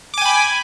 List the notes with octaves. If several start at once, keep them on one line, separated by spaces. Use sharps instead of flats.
G5 G#5 B5 D6